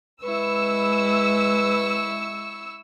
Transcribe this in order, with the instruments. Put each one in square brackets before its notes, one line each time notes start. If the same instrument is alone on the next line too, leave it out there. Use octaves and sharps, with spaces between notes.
[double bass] G#3 [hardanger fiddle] E4 C#6 [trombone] B4 [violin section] E6